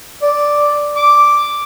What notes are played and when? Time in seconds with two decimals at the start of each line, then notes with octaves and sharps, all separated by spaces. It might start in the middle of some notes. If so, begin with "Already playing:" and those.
0.22 D5
0.97 D6